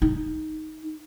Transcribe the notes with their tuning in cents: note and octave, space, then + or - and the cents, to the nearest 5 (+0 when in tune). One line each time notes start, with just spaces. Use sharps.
D#4 +5